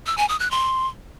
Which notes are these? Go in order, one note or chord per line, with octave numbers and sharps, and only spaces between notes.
E6
G#5
D#6
F#6
C6